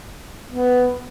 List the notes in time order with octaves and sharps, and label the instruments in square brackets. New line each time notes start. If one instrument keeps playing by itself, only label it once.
[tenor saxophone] B3